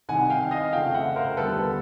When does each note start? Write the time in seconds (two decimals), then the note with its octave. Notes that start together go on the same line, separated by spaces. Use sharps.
0.08 C2 C3 D#3 F#5 G#5
0.30 F5 G5
0.51 D#5 F5
0.73 F2 C#3 F3 A3 F5 G5
0.94 E5 F#5
1.16 A#4 C5
1.37 D#2 D3 G3 B3 A4 B4